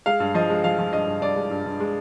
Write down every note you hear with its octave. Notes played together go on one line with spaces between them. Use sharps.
G#3 F5
G2
F3 D#5
G#3
F3 F5
F3
G2 D#5
G2
G2 D5
G#3
G2
G2
G#3